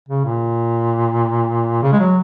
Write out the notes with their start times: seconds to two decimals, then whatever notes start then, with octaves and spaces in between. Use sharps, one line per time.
0.08 C#3
0.25 A#2
1.82 C#3
1.93 G#3
2.00 F#3